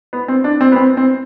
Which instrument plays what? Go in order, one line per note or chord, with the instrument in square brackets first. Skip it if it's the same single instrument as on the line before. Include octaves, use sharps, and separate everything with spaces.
[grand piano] B3
C4
D4
C4
B3
C4
C4